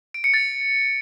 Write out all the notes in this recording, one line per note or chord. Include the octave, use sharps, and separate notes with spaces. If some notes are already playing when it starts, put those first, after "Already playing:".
D7
C#7
A6